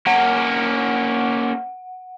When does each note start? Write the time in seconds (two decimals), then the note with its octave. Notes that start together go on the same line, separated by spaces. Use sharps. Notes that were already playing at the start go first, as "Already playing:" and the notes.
0.07 A#3 C#4 F#5